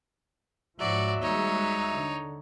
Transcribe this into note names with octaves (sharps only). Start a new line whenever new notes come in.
G#2 F3 F#3 F#4 D5 E5
D#2 G3 G#3 D#4 C#5
D3